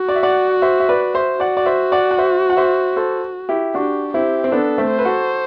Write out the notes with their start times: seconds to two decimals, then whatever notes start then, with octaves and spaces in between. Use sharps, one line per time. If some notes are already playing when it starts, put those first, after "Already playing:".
Already playing: F#4
0.08 D5
0.16 E5
0.23 D5 F#5
0.62 C5 E5
0.80 E5
0.89 B4 D5
1.14 C5 E5
1.40 F#4 D5 F#5
1.57 D5
1.66 C5 E5
1.92 D5 F#5
2.11 F#5
2.18 C5 E5
2.50 F#5
2.57 C5 E5
2.96 A4 C5
3.49 E4 G4
3.74 D4 F#4 G4
4.14 C4 E4 G4
4.44 C4
4.52 B3 D4 A4
4.78 A3 C4
4.91 C5
4.99 B4
5.05 F#4 A4